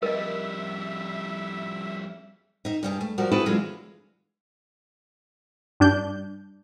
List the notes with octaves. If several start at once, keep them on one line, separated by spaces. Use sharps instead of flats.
F2 G3 A#4 D#5 E5
D#4 E5
G2 G3 G#4
A3
F3 G3 F#4 A#4
C4 E4 F#4 G#4 A4 B4
D3 E3 F#3 G#3 F4 G#4
G2 D4 G6